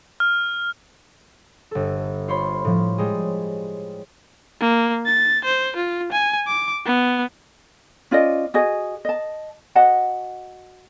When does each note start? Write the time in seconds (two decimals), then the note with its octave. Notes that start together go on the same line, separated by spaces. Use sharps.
0.20 F6
1.71 G1 A4
2.28 F4 C5 C#5 B5 C6
2.65 A2 F3
2.98 G3 G#3 G#4
4.61 A#3
5.06 A6
5.45 C5
5.76 F4
6.12 G#5
6.48 D6
6.86 B3
8.11 C#4 F4 D5 D#5
8.54 F#4 G#4 D#5
9.05 D#5 A5
9.75 F#4 D#5 F#5 A5